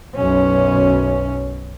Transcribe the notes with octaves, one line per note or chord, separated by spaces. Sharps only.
B1 F#2 C#4